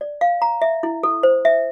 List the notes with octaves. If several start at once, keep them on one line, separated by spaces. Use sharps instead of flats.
D5
F5
A#5
E5
E4
A4
C5
E5